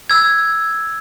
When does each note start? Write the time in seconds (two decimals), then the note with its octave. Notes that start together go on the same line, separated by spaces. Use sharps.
0.10 E6 G#6